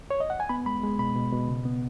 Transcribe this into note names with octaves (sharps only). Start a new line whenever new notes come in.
C#5
D#5
F#5
G#5
B3 B5
G#3 B5
G#3
B2 B5
B2
B2
C#3
B3